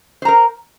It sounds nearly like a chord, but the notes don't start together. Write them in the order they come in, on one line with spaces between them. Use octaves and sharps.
C5 A#5 A#4